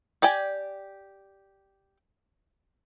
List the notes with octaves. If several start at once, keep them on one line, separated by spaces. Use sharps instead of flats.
G4 D5 G5 G#5